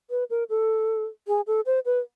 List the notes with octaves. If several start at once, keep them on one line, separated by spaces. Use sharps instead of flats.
B4
A#4
A4
G#4
A4
C5
B4